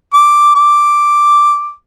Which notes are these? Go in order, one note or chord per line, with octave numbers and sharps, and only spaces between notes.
D6
D6